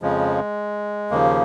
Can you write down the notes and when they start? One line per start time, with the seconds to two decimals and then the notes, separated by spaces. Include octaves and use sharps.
0.02 F2 C#3 F3 G#3
1.11 D#2 C#3 F3 A#3